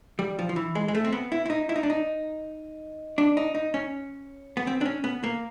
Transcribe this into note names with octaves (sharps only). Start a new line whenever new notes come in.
G3
F3
F3
E3
G#3
G#3
A3
C4
B3
E4
E4
D#4
E4
D#4
D4
D#4
D4
D#4
D#4
C#4
B3
C4
D4
C#4
B3
A#3